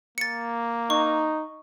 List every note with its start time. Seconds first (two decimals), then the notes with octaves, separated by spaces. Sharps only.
0.18 A#3 A6 C#7
0.90 D#4 C#6